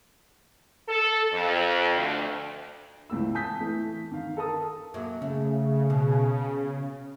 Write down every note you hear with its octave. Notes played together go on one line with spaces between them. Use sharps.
A4
F2
D2
C#2 A2 E3 E6
G#5 A5 D#6 G6 B6
E3 A3
D#3 F5
A4 A#4 A5 D#6
F#2 F#3 A#3
C#3 A3
B2